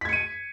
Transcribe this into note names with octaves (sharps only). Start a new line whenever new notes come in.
G#6 B6 C#7 D#7